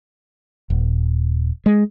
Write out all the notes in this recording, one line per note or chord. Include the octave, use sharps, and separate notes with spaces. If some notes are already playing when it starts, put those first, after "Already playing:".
D#1
G#3